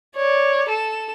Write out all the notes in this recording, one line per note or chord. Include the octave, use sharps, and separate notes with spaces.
C#5 D5
A4 E7